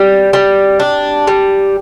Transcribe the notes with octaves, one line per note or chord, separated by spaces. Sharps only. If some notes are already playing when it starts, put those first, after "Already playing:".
Already playing: G3 G4
G3
D4
G3